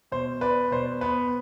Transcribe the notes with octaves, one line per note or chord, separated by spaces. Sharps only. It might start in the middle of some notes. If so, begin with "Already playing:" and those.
B2 C5
B3 B4 D5
B2 C5
B3 B4